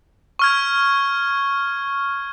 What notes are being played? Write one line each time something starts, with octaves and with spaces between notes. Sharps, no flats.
C#6 F6 G#6